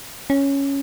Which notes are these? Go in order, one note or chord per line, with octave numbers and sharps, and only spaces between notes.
C#4